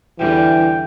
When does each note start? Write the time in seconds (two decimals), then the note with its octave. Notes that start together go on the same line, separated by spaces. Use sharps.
0.19 E2 D3 E3 G3 G5